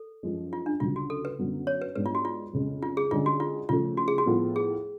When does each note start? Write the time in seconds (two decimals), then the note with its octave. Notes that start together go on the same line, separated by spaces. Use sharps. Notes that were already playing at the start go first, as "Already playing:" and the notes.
Already playing: A4
0.23 F#2 F3 G#3
0.53 F4
0.66 D4
0.80 D2 C#3 F#3 F4
0.96 F#4
1.10 A4
1.25 B4
1.39 F#2 D3 F#3 B3
1.67 C#5
1.82 B4
1.95 G#2 G#3 B3 D4 B4
2.06 F4
2.15 F#4
2.25 F4
2.53 F2 C#3 G#3
2.82 F4
2.97 G#4
3.11 D3 G#3 C#4 F4 G#4
3.26 F#4
3.40 F4
3.69 C#3 F3 A3 F4
3.97 F#4
4.08 G#4
4.18 F#4
4.26 A2 F3 B3 F4 A4
4.56 G#4